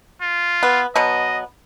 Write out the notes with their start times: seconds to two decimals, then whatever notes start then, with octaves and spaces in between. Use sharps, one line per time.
0.22 F4
0.63 B3
0.96 B2 F#3 B3 D#5